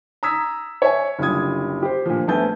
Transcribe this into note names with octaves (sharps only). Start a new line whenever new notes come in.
A#5 D#6 E6 G#6 B6
C#5 E5 G#5
F#1 D3 G3 F4 D#6 G#6
G4 C5
A#2 D3 F3
A#1 A3 B3 G#5 A5 G6